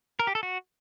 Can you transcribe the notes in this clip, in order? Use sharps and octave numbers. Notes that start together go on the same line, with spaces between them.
A#4
G4
A4
F#4